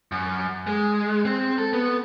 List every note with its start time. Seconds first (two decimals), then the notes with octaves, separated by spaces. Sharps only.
0.12 F#2
0.67 G#3
1.25 C4
1.58 A4
1.73 B3